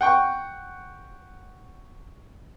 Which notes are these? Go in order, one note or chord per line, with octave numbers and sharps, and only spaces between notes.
F#5 G5 C#6